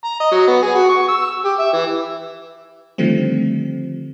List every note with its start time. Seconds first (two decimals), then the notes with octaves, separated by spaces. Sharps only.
0.04 A#5
0.20 D#5
0.32 F#3
0.48 B3
0.63 G#4
0.75 F#4
0.89 C#6
1.09 E6
1.45 G4
1.60 E5
1.73 E3
2.98 D3 D#3 F3 G3 A3 C4